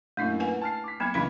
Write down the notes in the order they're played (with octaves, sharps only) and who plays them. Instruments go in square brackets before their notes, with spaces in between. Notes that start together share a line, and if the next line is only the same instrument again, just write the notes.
[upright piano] F#2 A#2 [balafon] A3 D4 E4
[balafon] B4 F#5 G#5
[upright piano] A5 F6 C7
D6 B6
[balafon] F#3 A#3 B3 [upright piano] B5 G#6 C#7
[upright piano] C#2 C#3 E3 [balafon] D4 F5 B5